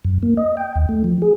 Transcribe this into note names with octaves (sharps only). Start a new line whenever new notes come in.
F#2
A#3
D#5
G5
D#2
A3
F3
G#4